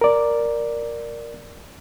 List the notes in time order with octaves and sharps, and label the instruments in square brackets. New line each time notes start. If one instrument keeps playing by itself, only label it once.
[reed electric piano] A#4 D5